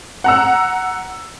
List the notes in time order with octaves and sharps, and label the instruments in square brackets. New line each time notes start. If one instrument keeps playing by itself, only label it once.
[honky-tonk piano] F#5 A#5 E6